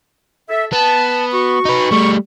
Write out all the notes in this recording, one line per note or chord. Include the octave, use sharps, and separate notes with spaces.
A4 E5
B3 A5
F#4 C#6
D#4 B4
G3 A3 C#6